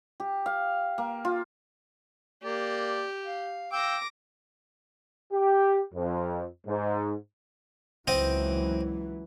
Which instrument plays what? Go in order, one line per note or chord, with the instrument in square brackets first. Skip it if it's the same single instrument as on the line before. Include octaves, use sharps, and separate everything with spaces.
[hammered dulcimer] G4
F5
A#3
F4
[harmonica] A#3 D5 [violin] G4
[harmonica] F5
[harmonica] F5 G5 E6 [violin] D6 A#6
[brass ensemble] G4
F2
G#2
[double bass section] C#2 E3 F#3 [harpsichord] C4 D#5 G5